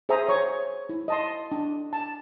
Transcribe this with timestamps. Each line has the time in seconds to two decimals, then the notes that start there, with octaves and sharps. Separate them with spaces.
0.09 G#4 C5 E5 G#5 A#5 D#6
0.29 C#5 C#6
0.89 E4
1.08 D#5 A5 C6
1.52 D4
1.93 A5